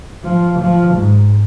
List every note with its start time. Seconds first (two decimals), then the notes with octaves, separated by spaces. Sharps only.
0.24 F3
0.59 F3
0.94 G#2